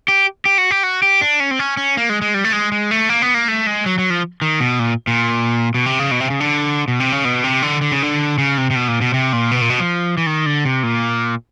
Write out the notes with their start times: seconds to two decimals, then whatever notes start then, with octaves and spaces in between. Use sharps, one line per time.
0.08 G4
0.45 G4
0.58 F#4
0.71 G4
0.83 F#4
1.02 G4
1.21 D4
1.40 C#4
1.51 C4
1.59 C#4
1.77 C#4
1.97 A#3
2.09 G#3
2.22 G#3
2.34 G3
2.44 A3
2.53 G#3
2.72 G#3
2.91 A3
3.09 A#3
3.22 B3
3.34 A#3
3.48 A3
3.67 G#3
3.86 F#3
3.98 F#3
4.10 F3
4.42 D#3
4.60 B2
4.79 A#2
5.07 A#2
5.74 B2
5.86 C3
5.99 C#3
6.11 B2
6.21 C3
6.30 C#3
6.40 D3
6.88 B2
7.00 C3
7.12 C#3
7.25 B2
7.44 C3
7.62 D3
7.81 D3
7.92 C#3
8.03 D3
8.38 C#3
8.58 C3
8.71 C3
8.75 B2
8.88 A#2
9.01 B2
9.14 C3
9.33 A#2
9.51 B2
9.61 A#2
9.70 B2
9.80 F3
10.18 E3
10.26 D#3
10.46 D3
10.65 C3
10.83 A#2